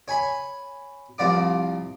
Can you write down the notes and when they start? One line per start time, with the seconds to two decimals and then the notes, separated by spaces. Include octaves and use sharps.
0.08 C#5 G#5 B5
1.18 C2 F3 F4 D5 D6